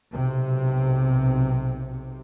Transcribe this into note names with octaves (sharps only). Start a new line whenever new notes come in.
B1 C3